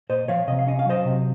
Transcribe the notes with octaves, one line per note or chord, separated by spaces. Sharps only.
A#2 C5 D#5
F3 C#5 F5
C3 D#5
F5
C#4 D#5
F5
F#3 C5 D#5
C3